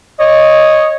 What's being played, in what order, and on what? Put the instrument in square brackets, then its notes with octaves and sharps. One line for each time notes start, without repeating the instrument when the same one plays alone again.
[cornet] C#5 [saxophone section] D#5